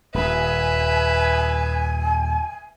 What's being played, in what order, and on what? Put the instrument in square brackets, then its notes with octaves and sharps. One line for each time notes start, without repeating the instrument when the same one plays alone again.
[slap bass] D#1 [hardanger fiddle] B4 E5 [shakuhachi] G#5